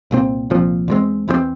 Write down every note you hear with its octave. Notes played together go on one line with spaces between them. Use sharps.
C2 A#2 F3 C4
C2 A#2 F3 C4
E2 E3 G#3 C4
E2 E3 G#3 C4